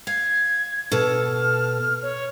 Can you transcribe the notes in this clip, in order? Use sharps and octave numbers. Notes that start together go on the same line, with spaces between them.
F5 G#6
B2 A4 F6
C#5